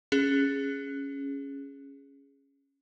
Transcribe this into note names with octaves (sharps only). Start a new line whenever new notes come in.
C#4 G#4